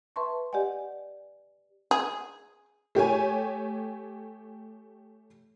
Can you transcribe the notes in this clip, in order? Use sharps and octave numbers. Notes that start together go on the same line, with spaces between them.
B4 E5 A5 C6 C#6
G4 D5 D#5 F#5 G#5
G#4
A3 G4 C#5 G#5